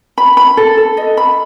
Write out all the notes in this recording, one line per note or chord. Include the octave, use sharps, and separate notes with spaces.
B5
B5
A4
A4
D#5
B5